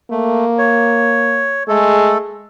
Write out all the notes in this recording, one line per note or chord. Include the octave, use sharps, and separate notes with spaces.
A3 A#3
C#5
G#3 A3 A4